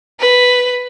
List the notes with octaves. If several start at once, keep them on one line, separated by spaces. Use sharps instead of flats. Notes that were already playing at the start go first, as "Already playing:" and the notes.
B4